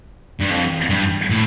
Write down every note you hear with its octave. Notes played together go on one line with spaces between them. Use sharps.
G2
F2
G2
A2